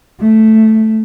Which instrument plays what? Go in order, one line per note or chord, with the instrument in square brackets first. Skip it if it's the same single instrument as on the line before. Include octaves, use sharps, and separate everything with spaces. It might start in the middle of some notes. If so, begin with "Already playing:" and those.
[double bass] A3